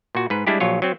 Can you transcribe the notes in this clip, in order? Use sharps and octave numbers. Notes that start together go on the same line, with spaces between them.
A#2 F#4
G#2 B4
G3 G#3 D4 E4 G4
A#1 F#3 F4 C#5
F#3 C4